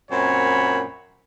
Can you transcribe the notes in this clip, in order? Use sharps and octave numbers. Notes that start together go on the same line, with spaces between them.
F#2 A#2 C4 C#5 B5